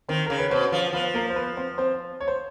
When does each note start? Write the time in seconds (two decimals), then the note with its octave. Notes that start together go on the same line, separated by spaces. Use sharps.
0.09 D#3 C4 C5
0.26 C#3 A#4
0.38 B4
0.50 B2 C4 C5
0.72 F3
0.93 F3 B3 B4
1.14 A#3 A#4
1.30 C5
1.36 B3 B4
1.57 C4 C5
1.78 C4 C5
2.20 C#5
2.28 C5